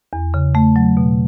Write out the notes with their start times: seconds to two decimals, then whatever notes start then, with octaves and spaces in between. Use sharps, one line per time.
0.13 E2
0.34 C#3
0.55 A3
0.76 F#3
0.97 B2